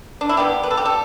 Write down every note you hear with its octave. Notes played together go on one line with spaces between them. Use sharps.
D4
E4
D3 G3 B3 G4
B4
A4
G4
A4